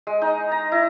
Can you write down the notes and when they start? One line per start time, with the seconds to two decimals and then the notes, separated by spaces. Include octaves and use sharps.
0.07 G#3
0.22 D#4
0.52 A#5
0.72 E4